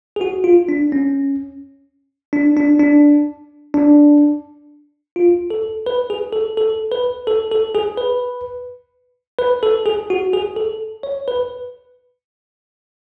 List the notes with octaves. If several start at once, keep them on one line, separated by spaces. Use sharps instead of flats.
G#4
F#4
F4
D4
C#4
D4
D4
D4
D4
F4
A4
B4
G#4
A4
A4
B4
A4
A4
G#4
B4
B4
A4
G#4
F#4
G#4
A4
C#5
B4